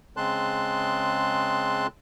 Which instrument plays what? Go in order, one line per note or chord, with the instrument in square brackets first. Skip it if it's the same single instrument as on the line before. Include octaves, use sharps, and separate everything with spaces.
[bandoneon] C#3 G#3 C4 A5 C6 F#6